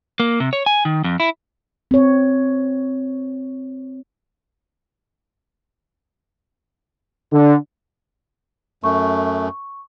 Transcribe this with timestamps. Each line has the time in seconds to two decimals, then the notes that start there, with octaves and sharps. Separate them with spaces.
0.20 A#3
0.40 C3
0.53 C#5
0.66 G#5
0.85 D#3
1.04 F2
1.20 E4
1.91 C4 C#5
7.32 D3
8.84 F#2 A3 C#6